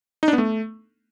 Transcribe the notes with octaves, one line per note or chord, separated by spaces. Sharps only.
D#4
D4
B3
A3